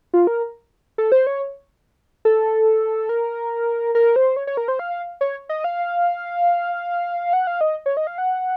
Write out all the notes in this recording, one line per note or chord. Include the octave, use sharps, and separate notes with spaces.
F4
A#4
A4
C5
C#5
A4
A#4
A#4
C5
C#5
C#5
A#4
C5
F5
C#5
D#5
F5
F#5
F5
D#5
C#5
D#5
F5
F#5